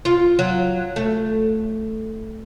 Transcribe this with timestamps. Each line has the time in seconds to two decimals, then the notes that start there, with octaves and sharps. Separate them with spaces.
0.05 F4
0.39 F#3
0.96 A3